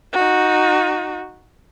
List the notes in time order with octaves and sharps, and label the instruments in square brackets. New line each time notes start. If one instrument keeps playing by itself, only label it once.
[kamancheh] D#4 F#4